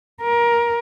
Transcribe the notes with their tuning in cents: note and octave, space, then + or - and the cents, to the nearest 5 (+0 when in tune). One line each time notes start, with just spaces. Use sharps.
A#4 +20